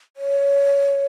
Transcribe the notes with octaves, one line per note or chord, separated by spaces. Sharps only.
C#5